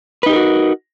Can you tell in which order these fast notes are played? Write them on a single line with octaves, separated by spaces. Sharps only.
B4 D#4 G4 A#4 F#4